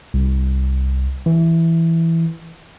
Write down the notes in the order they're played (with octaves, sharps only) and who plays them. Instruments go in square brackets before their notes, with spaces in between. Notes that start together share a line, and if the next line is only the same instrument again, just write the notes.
[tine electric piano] C2
E3